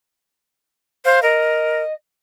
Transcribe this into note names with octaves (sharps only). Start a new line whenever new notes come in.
C5 F5
A#4 D#5